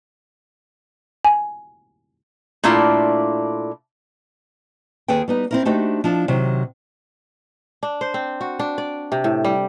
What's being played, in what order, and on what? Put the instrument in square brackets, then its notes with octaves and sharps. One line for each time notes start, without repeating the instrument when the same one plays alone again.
[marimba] G#5
[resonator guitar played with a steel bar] A#2 A3 D4 E4 F4 A4
[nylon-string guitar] D#2 G#4 A4 B4 G5
G3 B3 D#4
C4 E4 A#4
A3 D4 D#4 F#4 G4 C5
F3 D4 E4
C3 D#3 F#3
[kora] D4
C5
C4
F#4
D4
D5
C3
A2
G3